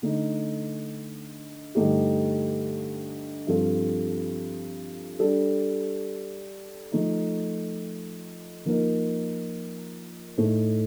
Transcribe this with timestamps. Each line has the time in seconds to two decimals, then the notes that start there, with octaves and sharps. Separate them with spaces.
0.02 D3 A3 D#4
1.75 G2 D3 A3 D#4 G4
3.47 G2 F3 C4 F4 A4
5.19 G3 D4 A4
6.92 F3 A3 D#4
8.65 F3 A#3 D#4 A#4
10.37 A2 A3 D#4